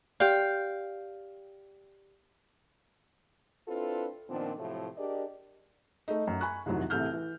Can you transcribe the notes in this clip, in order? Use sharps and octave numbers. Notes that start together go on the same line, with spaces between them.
G4 D5 F5 G5
C4 D4 E4 F4 A4 B4
A#2 D#3 F3 B3 C4 D4
A2 C3 F3 F#3 A3
D4 G4 G#4 A#4 D5 D#5
A3 D#4
F#2
G#5 B5 C#6 F#6
C2 F2 C3 D#3 F#3
A1 C3 A4 E5 F6 G6
E3